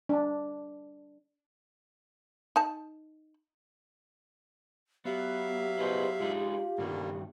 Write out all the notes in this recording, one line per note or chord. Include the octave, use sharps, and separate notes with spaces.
D4
D#4 A5
F#3 B3 G4 E5 F5
B2 E4 G#4 C5
G#3 D4 D#4 F4
G2 B2 D3 D#3 G3 A#3